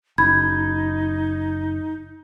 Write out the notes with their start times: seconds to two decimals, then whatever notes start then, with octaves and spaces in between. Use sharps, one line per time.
0.18 F#1 D#4 B5 G6 G#6